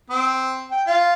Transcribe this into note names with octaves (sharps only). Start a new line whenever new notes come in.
C4
G5
F4